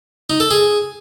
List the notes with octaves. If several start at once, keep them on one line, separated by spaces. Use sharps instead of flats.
D#4
A4
G#4